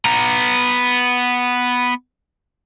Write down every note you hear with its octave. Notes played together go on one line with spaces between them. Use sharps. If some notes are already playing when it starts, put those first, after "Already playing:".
B3 A#5